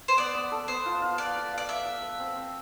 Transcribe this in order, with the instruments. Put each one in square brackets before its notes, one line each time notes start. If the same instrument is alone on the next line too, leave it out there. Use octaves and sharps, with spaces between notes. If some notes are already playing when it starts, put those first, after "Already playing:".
[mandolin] C5
[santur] B3 [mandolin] D5
[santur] B3
A4
[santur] B3 [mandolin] C5
[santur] F4
F4
[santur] B4 [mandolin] D5
[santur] B4
F5
[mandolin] D5
[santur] B4 [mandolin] E5
[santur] B4
B4
C4
C4